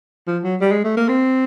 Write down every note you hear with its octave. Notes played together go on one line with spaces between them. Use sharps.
F3
F#3
G3
G#3
A3
A#3
C4